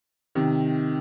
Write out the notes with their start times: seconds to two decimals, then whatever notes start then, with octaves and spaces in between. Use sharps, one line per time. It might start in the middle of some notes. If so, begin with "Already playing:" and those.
0.35 C3 D#3